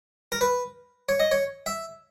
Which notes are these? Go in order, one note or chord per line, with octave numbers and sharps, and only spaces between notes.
A#4
B4
C#5
D#5
C#5
E5